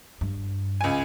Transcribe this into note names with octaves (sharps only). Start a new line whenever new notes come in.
G2
C#2 G#5